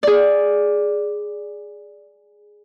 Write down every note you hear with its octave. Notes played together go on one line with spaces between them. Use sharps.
G#4 D5